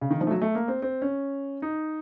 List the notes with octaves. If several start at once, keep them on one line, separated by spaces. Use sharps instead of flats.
C#3
D#3
F3
A3
F#3
A3
A#3
C4
C4
C#4
D#4